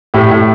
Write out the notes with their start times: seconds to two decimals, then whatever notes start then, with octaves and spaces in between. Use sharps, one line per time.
0.14 A2 G4
0.31 A2